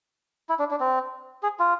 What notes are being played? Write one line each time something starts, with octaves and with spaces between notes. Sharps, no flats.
E4
D4
D4
C4
G#4
F4